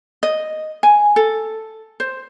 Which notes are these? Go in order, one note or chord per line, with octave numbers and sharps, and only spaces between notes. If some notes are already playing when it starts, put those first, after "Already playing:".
D#5
G#5
A4
C5